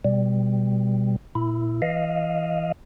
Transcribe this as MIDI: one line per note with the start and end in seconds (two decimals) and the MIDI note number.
0.05 1.16 47
0.05 1.16 55
1.35 1.81 46
1.35 1.81 64
1.82 2.72 52
1.82 2.72 75
1.82 2.72 77